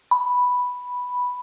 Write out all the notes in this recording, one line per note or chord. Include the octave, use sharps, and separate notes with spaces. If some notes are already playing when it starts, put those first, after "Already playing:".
B5